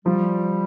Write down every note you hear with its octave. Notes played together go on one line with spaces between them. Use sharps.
F3 G3